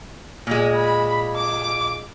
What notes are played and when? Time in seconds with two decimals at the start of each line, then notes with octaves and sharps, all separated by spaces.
0.47 A#2 G#3
0.76 B5
1.37 D6